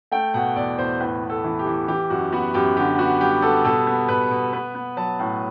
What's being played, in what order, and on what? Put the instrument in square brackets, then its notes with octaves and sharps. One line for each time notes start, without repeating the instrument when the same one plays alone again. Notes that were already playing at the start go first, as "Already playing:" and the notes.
[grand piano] A3 G5
B2 F#5
E2 D5
E2 C5
A2 B4
B3
A4
E3
G4
E3
E3 G4
F#2 F#4
B3 F#4
F#2 G4
D3 G4
B3 F#4
G3 G4
B3 A4
B2 A4
B3
B2 B4
B2
B3 B4
B3
F#3 A5
A2